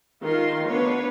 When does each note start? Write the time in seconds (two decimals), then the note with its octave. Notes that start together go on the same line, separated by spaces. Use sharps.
0.23 D#3 F4 C6
0.70 B3 D4 B4 C#5